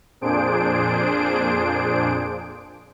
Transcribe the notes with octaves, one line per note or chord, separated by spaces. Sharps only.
F2 A#2 D4 G#4 C5 D7